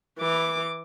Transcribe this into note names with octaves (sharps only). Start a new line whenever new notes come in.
E3 D6